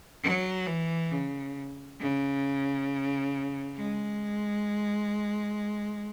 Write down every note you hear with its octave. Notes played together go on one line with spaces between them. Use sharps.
F#3
E3
C#3
C#3
G#3